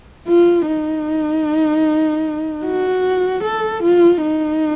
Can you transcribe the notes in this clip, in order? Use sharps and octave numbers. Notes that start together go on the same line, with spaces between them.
F4
D#4
F#4
A4
F4
D#4